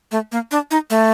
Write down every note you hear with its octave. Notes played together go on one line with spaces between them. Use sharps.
A3
A#3
D4
D#4
A3